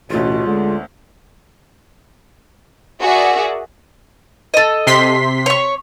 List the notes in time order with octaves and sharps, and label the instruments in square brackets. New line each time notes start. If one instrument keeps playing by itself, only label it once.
[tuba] A1 [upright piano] D2 B3 C#4 [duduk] B2 [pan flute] F4
[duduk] D3 [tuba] G#3
[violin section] F#4 G#4 A#4 D5 E5 F#5
[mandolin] A4 D#5
[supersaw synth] C3 C6 B6
[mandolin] C#5 C#6